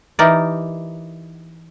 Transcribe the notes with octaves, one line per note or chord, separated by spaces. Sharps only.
E3 D#4 G4 A#4 D5